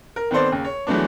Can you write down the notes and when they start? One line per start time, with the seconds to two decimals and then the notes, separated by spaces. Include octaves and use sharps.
0.16 A#4
0.31 D#3 B3 C4 A4 C5 D5
0.51 D#2 C#3
0.65 C#5
0.87 E3 F#3 G#3 A3 B3 D4